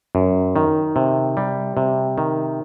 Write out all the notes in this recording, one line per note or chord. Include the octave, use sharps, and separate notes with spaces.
F#2
D#3
C3
G3
C3
D#3